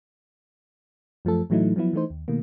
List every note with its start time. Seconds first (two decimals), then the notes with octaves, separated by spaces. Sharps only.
1.25 F#2 F3 A3 A4
1.50 A2 E3 F#3 A3 D#4 E4
1.76 F3 F#3 B3 E4
1.93 E3 A3 D#4 C5
2.10 D#2
2.28 B2 D#3 A3 A#3